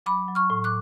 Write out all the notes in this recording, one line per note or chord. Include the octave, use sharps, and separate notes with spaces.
F#3 B5 D6
F#3
C#6 F6
A2
D6 F#6